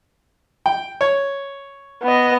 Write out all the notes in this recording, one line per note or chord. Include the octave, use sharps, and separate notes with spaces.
G5
C#5
B3 D#5